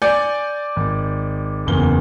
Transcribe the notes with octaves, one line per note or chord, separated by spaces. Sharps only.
D5 G#5 G6 C#7
G#1
F#1 E2 G7